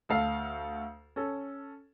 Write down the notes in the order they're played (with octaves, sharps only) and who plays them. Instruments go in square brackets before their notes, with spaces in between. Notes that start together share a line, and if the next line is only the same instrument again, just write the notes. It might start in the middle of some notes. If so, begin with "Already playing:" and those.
[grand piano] D2 A4 F5 C7
C#4 A4